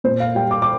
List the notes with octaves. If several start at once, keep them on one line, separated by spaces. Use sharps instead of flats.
A#2 C5
F5
G3 G5
D6
D6